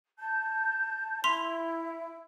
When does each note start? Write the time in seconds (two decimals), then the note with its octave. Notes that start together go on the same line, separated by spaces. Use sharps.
0.19 A5 G6
1.24 E4 C6 B6 F7